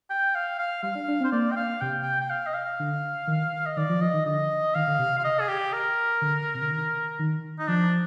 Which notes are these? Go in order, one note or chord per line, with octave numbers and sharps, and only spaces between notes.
G5
F5
F5
G3 F5
D4
D4
C4
C5
A#3 D5
G5
F5
C3 G5
G5
G5
F5
D#5
F5
D3
D#3
D#5
D#3 D5
F3
F3 D#5
D#3
D3 D#5
D#3 F5
D3
C3
F5
D#5
G#4
G4
A#4
D3
C3
D3
D#3
D#3
D#4
F3 D4